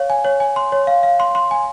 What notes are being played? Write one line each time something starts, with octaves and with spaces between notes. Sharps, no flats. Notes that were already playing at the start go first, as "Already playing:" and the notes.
Already playing: C#5 F5
G#5
C#5
G#5
C6
C#5
F5
F5
C6
C6
G#5